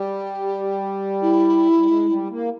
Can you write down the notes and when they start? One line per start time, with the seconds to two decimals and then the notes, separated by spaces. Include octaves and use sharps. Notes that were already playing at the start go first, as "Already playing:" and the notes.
Already playing: G3 G4
1.22 E4
1.76 G3
1.87 G#3
2.08 G3
2.30 A#3